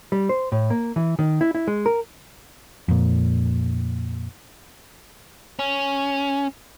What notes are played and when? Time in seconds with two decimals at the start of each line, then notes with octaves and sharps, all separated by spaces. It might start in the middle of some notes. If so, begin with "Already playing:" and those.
0.12 G3
0.29 C5
0.52 A2
0.70 A#3
0.96 E3
1.19 D#3
1.41 E4
1.55 E4
1.67 G#3
1.86 A#4
2.88 F2 A#2
5.59 C#4